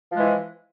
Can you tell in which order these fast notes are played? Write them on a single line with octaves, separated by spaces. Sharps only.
F3 G#3 E3